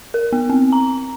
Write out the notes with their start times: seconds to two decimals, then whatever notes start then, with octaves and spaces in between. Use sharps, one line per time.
0.14 A#4
0.33 B3
0.50 C4
0.73 A#5